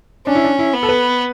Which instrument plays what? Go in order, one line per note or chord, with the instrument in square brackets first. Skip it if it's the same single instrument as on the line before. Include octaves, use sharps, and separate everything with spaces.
[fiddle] C#4 [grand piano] D4
[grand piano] E4
D4
E4
[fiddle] B3
[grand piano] A4
B4